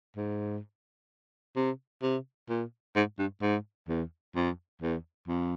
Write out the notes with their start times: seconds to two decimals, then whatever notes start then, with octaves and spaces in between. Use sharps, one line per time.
0.16 G#2
1.56 C3
2.03 C3
2.49 A#2
2.96 G#2
3.19 G2
3.42 G#2
3.88 E2
4.36 F2
4.82 E2
5.28 F2